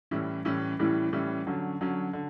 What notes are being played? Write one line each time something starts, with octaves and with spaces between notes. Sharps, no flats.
A2 E3 G3 C#4 E4
A2 E3 G3 C#4 E4
A2 E3 G3 C#4 E4
A2 E3 G3 C#4 E4
D3 F#3 C#4
D3 F#3 C#4
D3